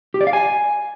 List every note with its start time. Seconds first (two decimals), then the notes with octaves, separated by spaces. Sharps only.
0.14 G4
0.21 D5
0.27 F5
0.33 G#5